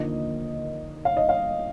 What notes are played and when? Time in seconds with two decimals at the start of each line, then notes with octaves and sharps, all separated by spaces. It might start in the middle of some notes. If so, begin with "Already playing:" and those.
Already playing: D#2 D3 F3 A#3 D#5
1.05 F5
1.17 D#5
1.29 F5